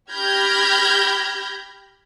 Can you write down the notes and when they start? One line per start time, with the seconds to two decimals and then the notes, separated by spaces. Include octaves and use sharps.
0.12 G4 B5 F6 G6 G#6 A#6